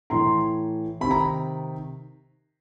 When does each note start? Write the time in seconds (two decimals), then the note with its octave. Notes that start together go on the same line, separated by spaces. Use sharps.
0.10 A2 E3 A#5 C6
1.01 C3 D#3 B5
1.11 A#5